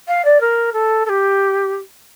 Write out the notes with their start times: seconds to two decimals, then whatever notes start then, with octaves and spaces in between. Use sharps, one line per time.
0.08 F5
0.25 D5
0.41 A#4
0.73 A4
1.06 A4
1.09 G4